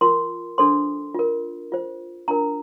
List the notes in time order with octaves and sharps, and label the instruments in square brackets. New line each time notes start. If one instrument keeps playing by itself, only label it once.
[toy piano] F4 A#4 C6
D4 A4 C5 C6
F4 A#4
F4 C5
D4 F4 A#4 A#5